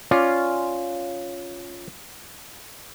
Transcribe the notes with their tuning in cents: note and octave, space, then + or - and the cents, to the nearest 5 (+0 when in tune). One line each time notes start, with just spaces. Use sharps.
C#4 +0 F4 +0 D5 +0